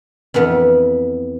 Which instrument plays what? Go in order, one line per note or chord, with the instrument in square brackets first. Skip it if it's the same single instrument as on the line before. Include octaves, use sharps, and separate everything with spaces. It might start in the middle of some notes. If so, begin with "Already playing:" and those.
[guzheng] F2 E3 B3 B4